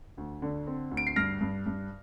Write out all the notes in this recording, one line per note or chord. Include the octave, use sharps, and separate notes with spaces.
D2
D3
C4
D2
D7
C7
G2 F6 A#6
G2
G2